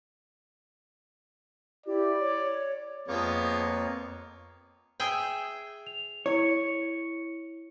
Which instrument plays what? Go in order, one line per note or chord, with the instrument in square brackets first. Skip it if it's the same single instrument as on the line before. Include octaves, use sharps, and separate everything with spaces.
[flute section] E4 G4 [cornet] D5
[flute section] C#5
[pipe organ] F2 A#3 C#5 [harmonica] F3 G#3 B3
[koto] G#4 E5 G5
[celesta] F7
[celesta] E4 C#7 [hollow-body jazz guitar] C#5